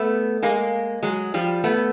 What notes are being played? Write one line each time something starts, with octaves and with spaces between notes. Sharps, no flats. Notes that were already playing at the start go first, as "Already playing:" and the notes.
Already playing: A3 B3
G#3 A#3
F#3 G#3
F3 G3
A3 B3